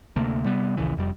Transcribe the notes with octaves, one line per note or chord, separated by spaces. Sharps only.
D2 C3 A3 A#3
C3 G3 B3
A#1 D#2 C#3 E3
F1 F2 G3